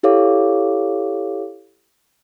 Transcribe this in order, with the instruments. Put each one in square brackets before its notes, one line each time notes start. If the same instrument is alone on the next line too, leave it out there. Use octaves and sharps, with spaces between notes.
[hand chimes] E4 G4 A4 C#5 F5 D6